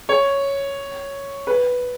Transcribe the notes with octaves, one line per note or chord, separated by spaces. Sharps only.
C#5
B4